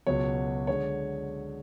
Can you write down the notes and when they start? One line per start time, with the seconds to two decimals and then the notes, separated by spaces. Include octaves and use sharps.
0.07 C#2 B2 F#3 C#5
0.67 D3 G#3 C#5